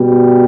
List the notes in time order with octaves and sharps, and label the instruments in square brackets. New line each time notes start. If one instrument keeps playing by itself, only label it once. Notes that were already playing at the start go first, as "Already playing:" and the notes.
Already playing: [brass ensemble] B2 G3